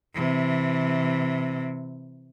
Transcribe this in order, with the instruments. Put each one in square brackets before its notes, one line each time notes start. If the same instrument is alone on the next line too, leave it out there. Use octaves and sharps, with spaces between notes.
[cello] C3 E3